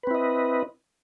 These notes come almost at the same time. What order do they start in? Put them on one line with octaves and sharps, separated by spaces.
B4 C4 E4 D#5